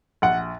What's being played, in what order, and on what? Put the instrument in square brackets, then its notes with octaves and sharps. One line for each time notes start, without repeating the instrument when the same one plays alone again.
[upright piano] A#1 F#5